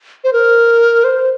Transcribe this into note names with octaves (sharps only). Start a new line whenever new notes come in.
C5
A#4
C5